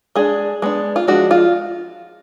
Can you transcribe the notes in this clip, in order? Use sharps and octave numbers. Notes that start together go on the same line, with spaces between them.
G#3 D4 G#4
G#3 B3 D4
F4
F3 G#3 D4 F#4
F4